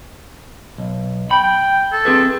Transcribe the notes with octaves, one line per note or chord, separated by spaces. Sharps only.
B1
G5 B5
G5
A4
C4 G#4 B4